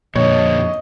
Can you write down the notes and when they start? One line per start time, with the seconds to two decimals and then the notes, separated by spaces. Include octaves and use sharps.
0.16 F2 A#2 D3 C#5 D#5